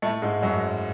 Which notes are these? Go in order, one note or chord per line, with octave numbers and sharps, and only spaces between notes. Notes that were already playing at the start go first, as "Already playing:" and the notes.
A2 A3
G#2 G#3
F#2 F#3